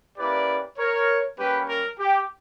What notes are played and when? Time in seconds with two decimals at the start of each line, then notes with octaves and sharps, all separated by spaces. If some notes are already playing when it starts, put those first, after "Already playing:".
0.18 A#3 C#4 E4 G4 B4 D5
0.78 A#4 C#5
1.38 G3 A#3 C#4 G4 B4
1.69 A#4
2.00 G4